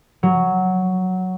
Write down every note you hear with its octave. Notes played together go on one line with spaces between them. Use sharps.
F#3